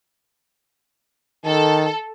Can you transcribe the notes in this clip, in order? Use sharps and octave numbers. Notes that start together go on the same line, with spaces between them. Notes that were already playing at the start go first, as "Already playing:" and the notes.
D#3 A4